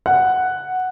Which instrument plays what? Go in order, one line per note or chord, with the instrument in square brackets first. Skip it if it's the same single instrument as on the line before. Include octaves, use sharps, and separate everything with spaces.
[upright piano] F#5